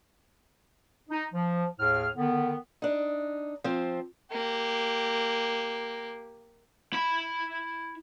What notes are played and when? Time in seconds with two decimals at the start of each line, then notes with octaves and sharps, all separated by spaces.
1.09 D#4
1.33 F3
1.79 D#2 A2 G#4 F6
2.15 D3 D#3 B3
2.82 D4 D#4
3.64 F3 C4
4.32 A#3 G4
6.93 E4 B5